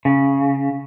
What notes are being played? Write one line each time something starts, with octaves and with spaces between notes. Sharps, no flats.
C#3